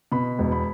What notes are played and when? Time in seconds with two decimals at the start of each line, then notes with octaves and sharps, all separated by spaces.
0.12 B2 B5
0.39 E1
0.52 B5